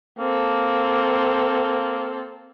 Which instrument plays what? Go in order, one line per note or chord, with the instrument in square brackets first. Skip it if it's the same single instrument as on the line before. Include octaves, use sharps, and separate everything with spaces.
[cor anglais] A#3 [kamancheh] C4 A4